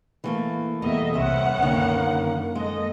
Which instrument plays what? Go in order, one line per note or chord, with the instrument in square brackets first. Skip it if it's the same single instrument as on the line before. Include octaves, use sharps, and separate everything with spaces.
[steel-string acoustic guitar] E3 A3 A#3
[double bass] E2 [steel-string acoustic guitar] B2 G3 A#3 [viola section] A4 D#5 E5
[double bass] C2 [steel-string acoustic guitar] C3 E5 [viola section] B3 C#4 F#5
[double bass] F#2 [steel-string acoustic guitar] D3 D#3 [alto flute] A#3
[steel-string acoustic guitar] G#3 [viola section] A4 D#5